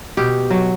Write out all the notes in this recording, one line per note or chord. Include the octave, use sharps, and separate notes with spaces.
B2 G4
F#3